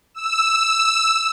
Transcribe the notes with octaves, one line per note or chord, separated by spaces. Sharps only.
E6